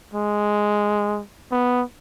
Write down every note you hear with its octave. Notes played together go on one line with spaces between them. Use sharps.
G#3
B3